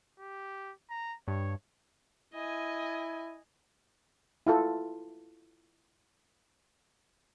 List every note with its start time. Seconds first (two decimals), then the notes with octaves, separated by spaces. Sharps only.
0.19 G4
0.90 A#5
1.28 G2 C#5
2.34 E4 D#5 G#5
4.47 E4 F4 A4